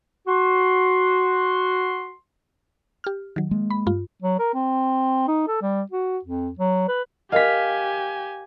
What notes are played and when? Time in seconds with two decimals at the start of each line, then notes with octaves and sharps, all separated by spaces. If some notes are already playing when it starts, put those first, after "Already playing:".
0.27 F#4 C6
3.04 G4 F6
3.36 D#3 F#3
3.51 G#3 A#3
3.70 B5
3.87 G2 F4
4.22 F#3
4.39 A#4
4.54 C4
5.28 D#4
5.48 A4
5.62 G3
5.92 F#4
6.25 F2
6.59 F#3
6.89 B4
7.32 G4 A#4 D#5 F5 G#5 B6